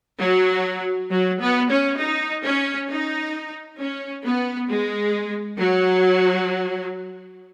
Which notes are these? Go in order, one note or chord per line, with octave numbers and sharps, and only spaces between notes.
F#3
F#3
B3
C#4
D#4
C#4
D#4
C#4
B3
G#3
F#3